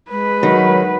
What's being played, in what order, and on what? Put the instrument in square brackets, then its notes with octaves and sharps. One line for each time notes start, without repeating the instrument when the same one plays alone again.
[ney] G#3 [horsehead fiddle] B4
[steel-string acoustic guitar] D#3 [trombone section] F#3